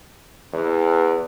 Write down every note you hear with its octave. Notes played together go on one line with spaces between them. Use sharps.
E2